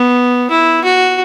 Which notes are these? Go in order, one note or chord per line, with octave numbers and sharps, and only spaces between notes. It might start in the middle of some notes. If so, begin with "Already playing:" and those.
Already playing: B3
E4
F#4